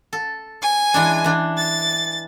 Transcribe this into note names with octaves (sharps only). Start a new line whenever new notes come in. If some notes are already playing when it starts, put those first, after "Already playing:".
A4
G#5
E3 G#3 D4
E3 D4
A6